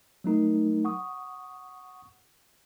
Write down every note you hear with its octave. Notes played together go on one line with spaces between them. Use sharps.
F#3 A3 D#4 A#4
F#5 C#6 D#6